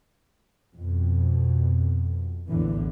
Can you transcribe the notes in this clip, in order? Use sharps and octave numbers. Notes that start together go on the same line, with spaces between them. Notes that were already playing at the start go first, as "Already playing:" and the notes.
F2 B2
A#1 E2 A2 D3 E3